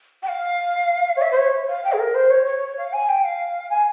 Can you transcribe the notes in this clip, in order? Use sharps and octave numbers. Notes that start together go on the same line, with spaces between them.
G5
F5
C#5
E5
C5
C#5
F5
G5
G#4
A#4
C5
C#5
C#5
F5
G#5
G5
F5
G#5